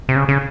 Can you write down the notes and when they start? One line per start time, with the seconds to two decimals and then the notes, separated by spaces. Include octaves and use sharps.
0.09 C3
0.16 C#3
0.29 C#3